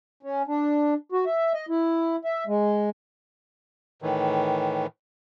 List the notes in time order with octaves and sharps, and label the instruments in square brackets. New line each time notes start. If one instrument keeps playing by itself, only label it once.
[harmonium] C#4
D4
F#4
E5
D#5
E4
E5
G#3
[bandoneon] A2 D#3 E3